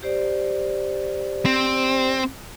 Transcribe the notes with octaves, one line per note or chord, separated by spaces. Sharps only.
G4 C5 D5
C4